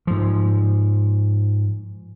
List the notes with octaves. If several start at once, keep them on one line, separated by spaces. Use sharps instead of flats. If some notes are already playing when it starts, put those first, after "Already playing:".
G#2 F3